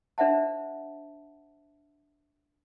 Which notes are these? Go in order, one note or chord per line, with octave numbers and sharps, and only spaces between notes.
D4 C5 E5 F#5 A5